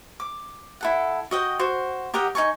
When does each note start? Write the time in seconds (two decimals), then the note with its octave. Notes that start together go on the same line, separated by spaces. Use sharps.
0.20 D6
0.81 E4 A4 F#5
1.31 F#4 D#5 G5
1.59 F#4 C5
2.14 G4 A#4 D#5 F#5
2.35 D#4 A4 G#5 C#6